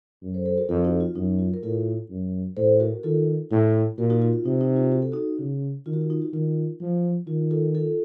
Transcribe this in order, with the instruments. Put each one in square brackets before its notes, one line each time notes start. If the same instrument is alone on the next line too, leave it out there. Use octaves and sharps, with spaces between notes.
[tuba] F#2
[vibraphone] A4 C5
A4 C5
F#4 A#4
[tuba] F2 [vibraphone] F4 A4
[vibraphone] D#4 F#4
F4
[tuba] F#2 [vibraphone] D#4
[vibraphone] F4
A#4
[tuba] A2 [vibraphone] F4 A4
[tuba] F#2
[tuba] A2 [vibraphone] A4 C5
[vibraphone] F#4 A#4
[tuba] D#3 [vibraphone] F4 A4
[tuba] A2
[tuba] A#2 [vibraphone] F#4 A#4
[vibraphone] D#4 F#4
F4
F4
[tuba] C3 [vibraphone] D#4
[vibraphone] D#4
F4
F#4
A4
D#4 F#4
[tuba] C#3
[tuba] D#3 [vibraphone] F4
[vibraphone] F#4
F4
D#4
F#4
[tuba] D#3 [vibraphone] F4
[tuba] F3
[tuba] D#3 [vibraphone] F4
[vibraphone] F4 A4
F4 A4